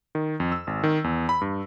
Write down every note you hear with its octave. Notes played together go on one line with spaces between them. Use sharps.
D#3
F2
E6
G#1
D#3
E2
B5
G2